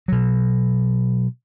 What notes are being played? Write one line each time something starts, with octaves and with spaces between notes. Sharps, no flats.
B2 F#3